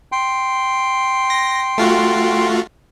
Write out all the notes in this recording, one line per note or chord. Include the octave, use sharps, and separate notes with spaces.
G5 C6
A#6
A3 F4 F#4